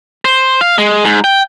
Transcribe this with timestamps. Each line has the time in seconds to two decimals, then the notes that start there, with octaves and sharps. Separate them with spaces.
0.25 C5
0.61 F5
0.78 G#3
1.05 G#2
1.24 G5